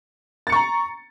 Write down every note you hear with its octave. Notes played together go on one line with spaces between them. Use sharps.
A#5 C#6 A6 C#7